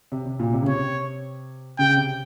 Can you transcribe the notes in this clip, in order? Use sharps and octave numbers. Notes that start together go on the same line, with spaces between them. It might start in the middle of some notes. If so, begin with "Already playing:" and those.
C3
C3
A#2
C3
C#3
C3 C#5
C#3 G5
C3